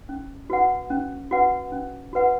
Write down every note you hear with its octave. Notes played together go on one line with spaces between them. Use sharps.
C#4
F#4 B4 F#5
C#4
F#4 B4 F#5
C#4
F#4 B4 F#5